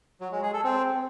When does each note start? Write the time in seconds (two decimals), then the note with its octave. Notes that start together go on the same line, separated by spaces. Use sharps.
0.21 F#3
0.32 G#3
0.42 G#4
0.53 A4
0.64 C4